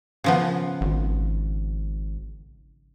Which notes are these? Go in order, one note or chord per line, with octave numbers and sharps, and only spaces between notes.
C#3 F3 B3
G#1